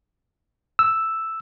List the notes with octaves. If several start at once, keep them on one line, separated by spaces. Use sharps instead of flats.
E6